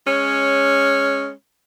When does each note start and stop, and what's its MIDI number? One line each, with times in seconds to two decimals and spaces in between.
0.07 1.30 56
0.07 1.30 61
0.07 1.30 73